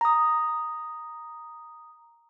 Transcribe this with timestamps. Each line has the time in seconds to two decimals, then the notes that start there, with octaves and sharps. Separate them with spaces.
0.01 A#5 D#6